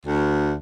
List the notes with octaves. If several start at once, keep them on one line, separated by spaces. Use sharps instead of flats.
D2